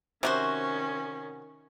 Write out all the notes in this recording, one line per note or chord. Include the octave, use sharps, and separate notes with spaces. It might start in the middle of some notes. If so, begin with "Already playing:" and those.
C3 D#3 C#4 F#4 C5